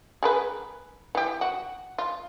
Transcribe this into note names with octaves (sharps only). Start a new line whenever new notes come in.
G#4 A#4 B4
E3 G4
F#4
F4